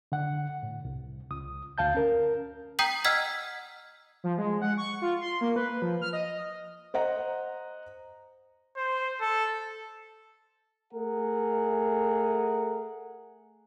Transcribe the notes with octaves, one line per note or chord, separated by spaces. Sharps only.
D3 F#5
A2
C2
C#2 D#6
D2 F5 A5 G6
C#4 A#4
G5 A#5 D#6 G6 B6 F#7
D#5 F#5 E6 F6 G#6 B6
F3
G#3
F#5
C#6
F4
C6
A#3
B4
F3
F6
D#5
C5 D#5 F#5 A#5
C5
A4
A3 G#4 A#4 F#5